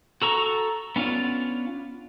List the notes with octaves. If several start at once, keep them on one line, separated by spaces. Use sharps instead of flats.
F#4 A4 A#5 C#6
B3 C#4 D4 F4